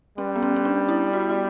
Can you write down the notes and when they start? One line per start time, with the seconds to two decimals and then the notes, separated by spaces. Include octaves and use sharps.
0.18 G3 C#4
0.36 B3
0.43 C#4
0.56 C#4
0.65 D4
0.89 E4
1.13 F#4
1.30 F#4